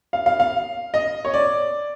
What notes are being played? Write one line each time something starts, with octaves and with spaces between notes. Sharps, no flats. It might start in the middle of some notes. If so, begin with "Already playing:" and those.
F5
F5
F5
D#5
C#5
D5